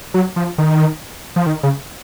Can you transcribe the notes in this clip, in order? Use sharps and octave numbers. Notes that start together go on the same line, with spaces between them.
F#3
F3
D#3
F3
D#3
C#3